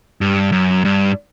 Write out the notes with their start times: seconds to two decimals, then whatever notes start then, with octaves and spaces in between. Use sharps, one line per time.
0.21 G2
0.52 F#2
0.85 G2